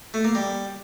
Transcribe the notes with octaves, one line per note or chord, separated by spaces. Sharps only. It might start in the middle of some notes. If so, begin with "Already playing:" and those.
A3
A#3
G3